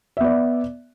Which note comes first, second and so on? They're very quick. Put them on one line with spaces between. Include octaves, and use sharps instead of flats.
E5 B3 D5